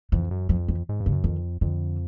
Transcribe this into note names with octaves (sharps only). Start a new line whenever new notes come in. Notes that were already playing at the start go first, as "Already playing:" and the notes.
F2 E3
F#2
F2 F3
E3
G#2
G2
C#3
F#2
F2 D#3
F2 D3